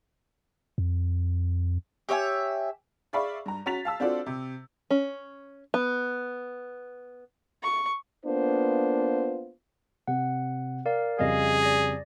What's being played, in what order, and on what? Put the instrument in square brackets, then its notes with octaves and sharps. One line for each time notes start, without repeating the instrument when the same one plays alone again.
[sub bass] F2
[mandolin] G4 C#5 E5 G#5
[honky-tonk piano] G#4 D5 E5 F5 B5 C#6
G2 A#5
C#4 F#4 A#5 A6 B6 F7
F5 A5 E6
C4 D4 F4 F#4 A4 D5
C3
[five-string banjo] C#4
B3
[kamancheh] C#6
[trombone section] A#3 B3 D4 F4 C5
[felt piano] C3 [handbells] F#5
[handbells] A#4 D5 F5
[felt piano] F2 C#3 G3 [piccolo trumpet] G#4 [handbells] D#5 F5
[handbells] D5 A#6